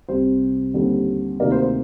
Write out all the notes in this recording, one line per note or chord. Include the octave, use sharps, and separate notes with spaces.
C2 C3 G3 C4 C5
D#2 D3 G3 C4
D2 C3 D#3 A#3 A#4 D5
C5
C5